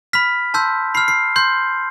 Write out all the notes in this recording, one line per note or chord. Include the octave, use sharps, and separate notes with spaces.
B5 F6 B6
A5 C6 E6 G6
B5 F6 C7
C7
C6 G6